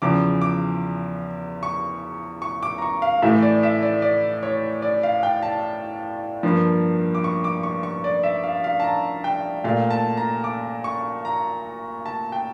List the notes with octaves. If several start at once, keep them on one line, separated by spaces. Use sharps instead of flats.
E2 C#3 F3 D6
D6
C#6
C#6
D6
A#5
C#6
F5
A2 E3 A3 E5
D5
E5
D5
D5
C#5
D5
F5
G5
A5
G2 F3 A#3
D6
C#6
D6
C#6
C#6
D5
E5
F5
F5
A5
A#5
G5
A#2 A3 F5
A5
A#5
D6
C#6
A#5
A5
G5